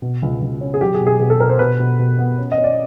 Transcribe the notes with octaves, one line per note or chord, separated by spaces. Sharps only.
B2
C#2
C#2
C#4
G#4
F#3 G4
G#4
B2
G#4
B2 G#4
A4
B2 A#4
C5
B2 B4
B2
B2
B3
C#4
D#5
C#4
D5